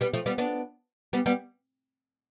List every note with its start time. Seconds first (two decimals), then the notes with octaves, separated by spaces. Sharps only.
0.01 G3 B3
0.13 F3 A3
0.26 G3 B3
0.38 B3 D4
1.13 G3 B3
1.26 G3 B3